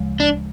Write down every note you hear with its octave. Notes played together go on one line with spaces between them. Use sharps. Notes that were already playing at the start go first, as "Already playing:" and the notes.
Already playing: D2 C#3 F3 G#3
D4